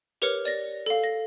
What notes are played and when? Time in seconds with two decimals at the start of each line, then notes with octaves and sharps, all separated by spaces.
0.22 G4 A#4 B4 C#5 F6 C#7
0.45 D5 A6 A#6
0.86 A4 F5
1.04 A#6